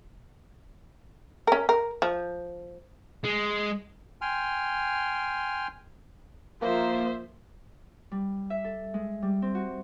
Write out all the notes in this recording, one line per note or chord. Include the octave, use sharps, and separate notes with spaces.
C#4 A#4
A#4
F3
G#3
G5 G#5 C6 F6
F3 A#3 F4 C5 E5
G3
E5
A4
G#3
G3
C4
F#4